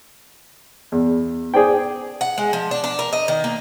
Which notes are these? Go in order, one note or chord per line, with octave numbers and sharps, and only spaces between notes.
E2
G#4 C5 D5 G5
F#5
G#3
F3
D4
D4
A#4
D#5
D#3
A#3